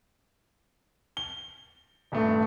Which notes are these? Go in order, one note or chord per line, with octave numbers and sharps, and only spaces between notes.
G7
D#1 G2 A3